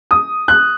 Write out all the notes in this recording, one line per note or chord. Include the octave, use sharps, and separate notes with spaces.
D#6
F#6